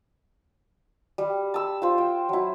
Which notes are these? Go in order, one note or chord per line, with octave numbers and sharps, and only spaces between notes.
G3
A5 E6
F4 C5
G5
F#3 E4